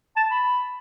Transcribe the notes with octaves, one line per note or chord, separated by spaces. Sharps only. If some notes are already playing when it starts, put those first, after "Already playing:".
A5
B5